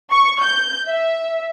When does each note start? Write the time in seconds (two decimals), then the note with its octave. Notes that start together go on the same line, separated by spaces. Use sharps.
0.11 C#6
0.42 G6
0.87 E5